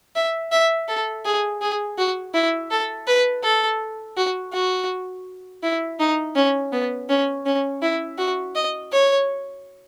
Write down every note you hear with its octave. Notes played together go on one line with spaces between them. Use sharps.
E5
E5
A4
G#4
G#4
F#4
E4
A4
B4
A4
F#4
F#4
E4
D#4
C#4
B3
C#4
C#4
E4
F#4
D#5
C#5